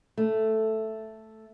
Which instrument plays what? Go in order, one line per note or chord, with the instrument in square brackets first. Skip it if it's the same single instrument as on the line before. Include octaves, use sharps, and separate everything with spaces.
[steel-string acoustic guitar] A3